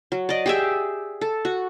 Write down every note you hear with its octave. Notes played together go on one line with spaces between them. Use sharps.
F#3
D5 D#5
G4 G#4 E5
A4
F#4